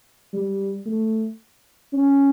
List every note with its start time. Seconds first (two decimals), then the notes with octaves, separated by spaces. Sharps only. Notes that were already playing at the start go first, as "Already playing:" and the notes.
0.34 G3
0.86 A3
1.93 C#4